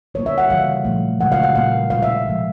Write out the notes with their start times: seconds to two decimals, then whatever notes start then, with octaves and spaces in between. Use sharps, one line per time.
0.14 D3 G3 A#3 C#5
0.26 E5
0.38 F#5
0.49 C#3 E3 G3 A#3 F5
0.85 A#2 F3 A3
1.20 C#3 E3 G#3 F#5
1.32 F5
1.43 F#5
1.55 A#2 G3 A#3 F5
1.90 B2 G#3 F5
2.03 E5
2.26 C3 F3 G#3